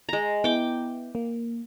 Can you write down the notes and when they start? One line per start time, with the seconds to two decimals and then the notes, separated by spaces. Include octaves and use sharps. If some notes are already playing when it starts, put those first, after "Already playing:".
0.09 G#3 A#5
0.44 B3 E4 G5 D6
1.15 A#3